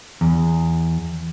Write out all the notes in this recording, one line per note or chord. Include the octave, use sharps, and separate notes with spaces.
E2